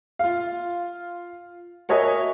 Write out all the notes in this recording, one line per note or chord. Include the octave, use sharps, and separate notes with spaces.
F4 F5
F#4 A#4 C#5 D#5 E5 G#5